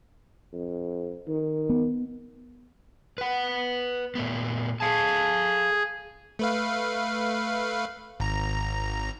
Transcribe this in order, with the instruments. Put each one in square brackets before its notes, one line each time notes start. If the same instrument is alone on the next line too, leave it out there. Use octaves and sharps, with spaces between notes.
[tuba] F2
D#3
[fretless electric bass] B3
[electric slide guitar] B4 F#5
A#2 A3 B3
[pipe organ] G#4 [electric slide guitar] A4 F5 A5
[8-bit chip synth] A3 B4 F5
G#1 A#5